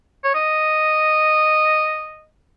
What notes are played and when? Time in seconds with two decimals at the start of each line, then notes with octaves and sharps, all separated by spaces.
0.24 C#5
0.35 D#5